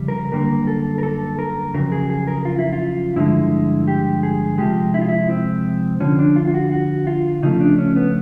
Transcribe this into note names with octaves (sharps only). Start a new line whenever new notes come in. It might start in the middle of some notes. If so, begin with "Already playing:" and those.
Already playing: F2 C#3 E3 G3
A#4
F#2 D3 G3 A#3 A#4
A4
A#4
A4
A#4
F2 C#3 F#3 A#4
G#4
G#4
A#4
F4
E4
F4
G2 D3 F3 G#3 E4
G4
G#4
C3 F3 G#3 G4
E4
F4
E4
C4
F2 D3 F3 C#4
D4
F4
F4
F#4
F#4
F4
C#3 F3 A3 D#4
D4
C#4
B3